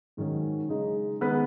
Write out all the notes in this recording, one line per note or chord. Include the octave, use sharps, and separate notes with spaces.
G#2 D#3 F#3 C#4
C#3 G#3 D#4
D#3 G#3 B3 D#4 B4